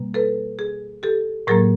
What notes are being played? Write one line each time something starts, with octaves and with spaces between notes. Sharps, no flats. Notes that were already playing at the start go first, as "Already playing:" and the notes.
Already playing: B2 G3 A#3
A4 B4
G#4
G4 A4
A2 F#3 A#3 G#4 A#4